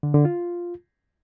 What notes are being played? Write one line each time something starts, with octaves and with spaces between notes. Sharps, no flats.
D3
D3
F4